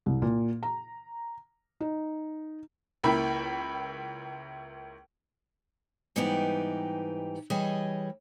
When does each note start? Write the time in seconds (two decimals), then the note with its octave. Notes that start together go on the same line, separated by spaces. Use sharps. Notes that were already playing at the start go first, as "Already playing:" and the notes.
0.06 C2
0.22 A#2
0.63 A#5
1.81 D#4
3.04 C#2 A#3 E4 A#4 G5 B5
6.16 G#2 E3 G3 B3 D#4 G4
7.50 E3 G3 G#4 C#5 D#5